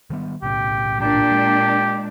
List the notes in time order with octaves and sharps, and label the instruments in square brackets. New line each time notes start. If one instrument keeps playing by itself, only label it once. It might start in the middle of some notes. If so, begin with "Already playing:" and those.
[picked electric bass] D#3 G3 B3
[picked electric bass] B1 A2 C#3 [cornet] G4
[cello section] A#2 D4 [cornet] G4
[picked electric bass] G#3